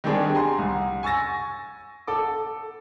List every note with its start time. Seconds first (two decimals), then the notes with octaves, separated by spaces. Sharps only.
0.04 D#3 G3 C4 D4 G#4
0.35 G#5 A#5 C6
0.58 C2
1.03 G#5 C#6 E6 A6 A#6
2.07 A4 D6